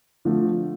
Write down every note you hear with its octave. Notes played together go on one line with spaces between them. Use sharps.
D3 F3 A3